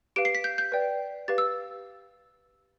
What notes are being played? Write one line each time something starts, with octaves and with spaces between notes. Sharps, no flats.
G4 B4 F5 D7
C7
B6
G6
G6
B4 D5 G5
G4 B4 F5 A6
E6